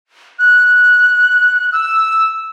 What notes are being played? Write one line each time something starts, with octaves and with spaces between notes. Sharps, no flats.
F#6
E6